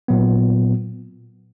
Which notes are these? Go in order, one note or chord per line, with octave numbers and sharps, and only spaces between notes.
A#2 F#3 B3